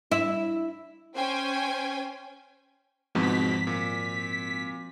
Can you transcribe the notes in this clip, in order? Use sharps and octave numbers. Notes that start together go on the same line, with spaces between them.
E4
C#4 C5 G5 G#5
G#1 E2 G#2 B2 F3 B6
A#2